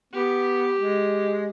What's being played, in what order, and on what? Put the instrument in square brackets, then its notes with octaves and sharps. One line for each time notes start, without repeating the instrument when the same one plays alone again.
[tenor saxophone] B3 [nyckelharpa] G4
[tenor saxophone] G#3